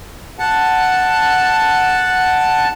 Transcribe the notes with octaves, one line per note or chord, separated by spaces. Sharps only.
F#5 A5